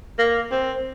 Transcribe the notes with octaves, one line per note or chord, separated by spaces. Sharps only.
A#3
C4